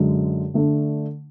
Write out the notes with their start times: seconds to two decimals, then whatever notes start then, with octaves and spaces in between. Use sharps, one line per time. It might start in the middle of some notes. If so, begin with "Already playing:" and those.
Already playing: F#2 D3 G#3
0.54 D3 A3 D4